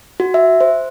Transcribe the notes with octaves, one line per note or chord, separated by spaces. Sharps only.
F#4
E5
C5